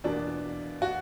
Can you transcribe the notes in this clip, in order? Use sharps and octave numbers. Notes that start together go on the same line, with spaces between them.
E2 B2 A#3 D4
F#4